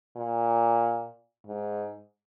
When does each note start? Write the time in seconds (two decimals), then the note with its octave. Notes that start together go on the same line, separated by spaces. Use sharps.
0.16 A#2
1.47 G#2